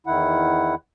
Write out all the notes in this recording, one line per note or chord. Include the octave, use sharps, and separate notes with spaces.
E2 D#3 E4 F#5